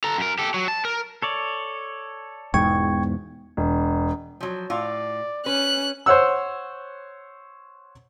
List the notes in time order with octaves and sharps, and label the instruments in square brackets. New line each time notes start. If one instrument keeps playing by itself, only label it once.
[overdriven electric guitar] A4 A#5
F#2 A#4
G4 A4
F#3
A5
A#4
[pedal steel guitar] A4 C#5 D5
[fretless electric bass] E1 E2 G#2 [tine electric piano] G5 C#6 G#6
[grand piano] E1
[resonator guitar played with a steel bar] F3 F#3
[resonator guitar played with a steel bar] A2 F4 [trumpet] D5
[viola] C#4 [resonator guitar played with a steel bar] B4 [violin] F#6
[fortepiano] C5 C#5 F#5 E6